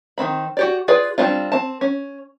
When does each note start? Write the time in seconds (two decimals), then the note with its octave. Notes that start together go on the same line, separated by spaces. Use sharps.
0.18 D#3 F#3 C4 B5
0.57 F#4 G4 D5
0.88 F4 G#4 B4 D5
1.18 G3 C4 D4 F4
1.52 C4 A5
1.81 C#4